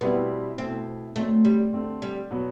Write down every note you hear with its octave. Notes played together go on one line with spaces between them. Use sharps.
B2 G3 B3 C4 E4
B2 A3 C4 E4
D3 F#3 A3 C4
G3
D3 A3 C4
G3
B2 F#3 B3